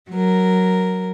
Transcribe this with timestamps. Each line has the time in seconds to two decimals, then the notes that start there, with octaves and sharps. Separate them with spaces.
0.10 F#3 A#4